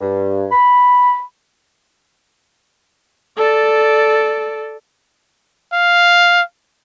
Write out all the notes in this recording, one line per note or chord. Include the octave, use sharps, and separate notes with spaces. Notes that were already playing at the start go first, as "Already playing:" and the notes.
G2
B5
A4 D5
F5